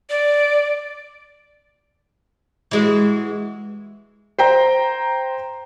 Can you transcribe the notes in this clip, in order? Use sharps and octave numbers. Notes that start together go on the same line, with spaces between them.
D5
E3 G#3 F#4
C5 G5 A#5